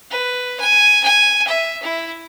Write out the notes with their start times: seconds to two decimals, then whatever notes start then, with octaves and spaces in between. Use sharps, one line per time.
0.11 B4
0.60 G#5
1.04 G#5
1.47 E5
1.83 E4